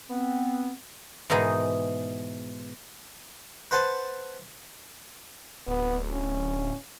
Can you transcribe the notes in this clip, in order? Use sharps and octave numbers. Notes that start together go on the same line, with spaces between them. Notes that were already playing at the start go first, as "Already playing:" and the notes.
B3 C4
G#2 B2 E3 D#4 G#4
B4 C5 F#5 A5
D1 B3
C#4